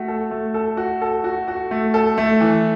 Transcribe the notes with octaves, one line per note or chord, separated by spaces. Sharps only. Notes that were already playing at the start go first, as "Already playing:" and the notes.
Already playing: A3 F#4
A4
A3
A4
F#4
A4
F#4
F#4
A3
A4
A3
E3